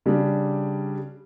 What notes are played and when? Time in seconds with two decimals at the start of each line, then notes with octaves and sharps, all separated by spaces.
0.06 C#3 G3 D4